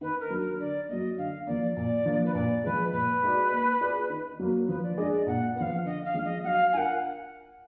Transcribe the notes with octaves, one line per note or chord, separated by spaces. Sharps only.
D#3 B4
A#4
F#3 D4
A#4
D3 D5
F#3 A#3 D#5
D3 F5
F3 A#3 D5
A#2 D5
F3 A#3 D4
B4
A#2 D5
F3 G#3 B4
A#2 B4
G#3 D#4 F#4 D5
A#3
F4 G#4 D5
D#3
F#3 A#3
F3 B4
D5
G#3 D4 G#4 D5 D#5
D5
A#2 F#5
F3 B3 F5 F#5
D3 D#5
F5
F3 G#3 D4
D#5
F#3 F5 F#5
D4 F4 A#4 F#5 G#5